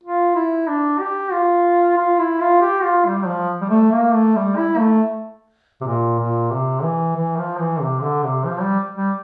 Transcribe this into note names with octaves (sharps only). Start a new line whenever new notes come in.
F4
E4
D4
G4
F4
F4
E4
F4
G4
F4
G3
F3
G3
A3
A#3
A3
G3
E4
A3
C3
A#2
A#2
C3
E3
E3
F3
E3
C3
D3
C3
F3
G3
G3